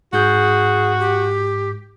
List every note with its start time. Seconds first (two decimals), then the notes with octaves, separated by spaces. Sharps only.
0.13 G#2 F#4 G#4 G6
0.99 G4